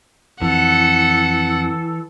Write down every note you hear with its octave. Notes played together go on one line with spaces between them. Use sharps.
F2 E3 A4 F#5